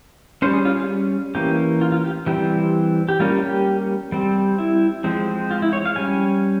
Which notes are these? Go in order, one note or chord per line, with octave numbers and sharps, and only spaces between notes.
G3 C#4 C5
G#4
F4
G#4
E3 A#3 C#4 G4
F4
F4
G4
E3 G3 C4 G4
G4
G3 A#3 C#4 F4
G4
G3 C4
E4
F3 G#3 C4
F4
E4
C#5
F5
G3 C#4 G#5